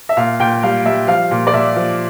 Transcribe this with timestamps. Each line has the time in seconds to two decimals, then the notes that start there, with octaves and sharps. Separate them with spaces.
0.09 E5
0.17 A#2 F5
0.39 A#2 G5
0.63 G3 F5
0.85 G3 E5
1.07 F3 F5
1.31 A#2
1.47 D5
1.53 A#2 E5
1.76 F3